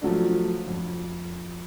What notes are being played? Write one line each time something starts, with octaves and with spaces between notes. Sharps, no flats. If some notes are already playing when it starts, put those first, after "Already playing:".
F3 F#3 A3 D4
F2